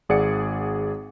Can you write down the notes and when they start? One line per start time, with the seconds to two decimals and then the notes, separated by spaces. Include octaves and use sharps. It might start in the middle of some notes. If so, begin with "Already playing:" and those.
0.09 G#1 G#4 D5 F#5 C#7